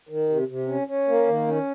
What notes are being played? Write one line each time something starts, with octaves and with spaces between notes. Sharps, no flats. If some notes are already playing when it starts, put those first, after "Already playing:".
D#3
C3
C3
C#4
C#4
A#3
D#3
C#4